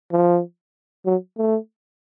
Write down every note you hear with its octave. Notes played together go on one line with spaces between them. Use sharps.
F3
F#3
A3